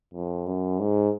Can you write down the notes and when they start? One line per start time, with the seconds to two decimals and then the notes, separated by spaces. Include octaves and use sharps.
0.13 F2
0.46 F#2
0.80 G#2